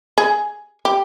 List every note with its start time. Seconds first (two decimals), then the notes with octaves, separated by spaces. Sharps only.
0.18 G#4
0.85 G4